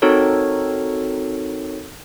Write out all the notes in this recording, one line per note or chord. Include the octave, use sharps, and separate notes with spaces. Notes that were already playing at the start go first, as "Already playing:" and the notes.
C4 D#4 F#4 A4 A#4 C#5